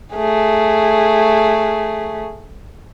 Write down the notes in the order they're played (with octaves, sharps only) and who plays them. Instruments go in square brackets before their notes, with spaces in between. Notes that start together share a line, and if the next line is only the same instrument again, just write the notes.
[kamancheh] A3 G#4